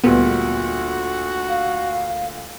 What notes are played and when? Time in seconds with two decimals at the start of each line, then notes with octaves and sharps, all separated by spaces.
0.04 D2 A#2 G3 B3 F#4
1.49 F5